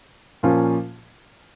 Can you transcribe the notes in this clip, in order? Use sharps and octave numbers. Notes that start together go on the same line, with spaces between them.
A#2 F3 A#3 C#4 F4